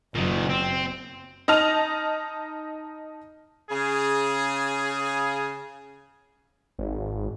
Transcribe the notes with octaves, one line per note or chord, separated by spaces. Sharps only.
F#1 A#2 D#3 F#3
C4
D#4 D#5 A5 F6 F7
C#3 G#4
G#1